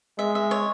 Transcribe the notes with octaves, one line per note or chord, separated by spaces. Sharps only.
G#3 E5
E5
C#5